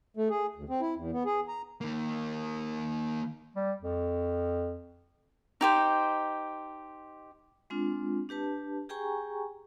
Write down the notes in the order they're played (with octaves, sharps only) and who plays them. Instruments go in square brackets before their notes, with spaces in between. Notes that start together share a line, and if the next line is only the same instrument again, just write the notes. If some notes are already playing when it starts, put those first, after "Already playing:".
[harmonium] A3
G#4
D2
C4
E4
E2
B3
G#4
A#5
[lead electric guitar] D#3 A#3
[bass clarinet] G3
F2
[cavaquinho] D#4 G4 C5
[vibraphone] G#3 C4 D4 F4
D4 G4 B4 A5
G4 G#4 G5 G#5 A#5 C#6